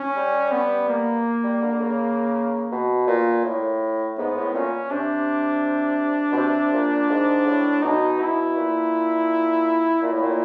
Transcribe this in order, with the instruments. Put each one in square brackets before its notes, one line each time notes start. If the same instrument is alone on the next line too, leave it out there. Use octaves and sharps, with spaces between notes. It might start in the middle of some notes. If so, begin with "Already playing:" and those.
Already playing: [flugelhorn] C#4
[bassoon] G3
[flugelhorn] B3
A#3
[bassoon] G3
D3
D3
C#3
B2
A#2
A2
[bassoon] G#2 [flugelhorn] B3
[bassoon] A2
[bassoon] A#2 [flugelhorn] C#4
[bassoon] C3 [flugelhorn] D4
[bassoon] B2
C3
A#2
G#2
A2
[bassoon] B2 [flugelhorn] D#4
[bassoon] B2 [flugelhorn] E4
[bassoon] A#2
[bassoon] A#2 [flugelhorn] E4
[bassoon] A2
A#2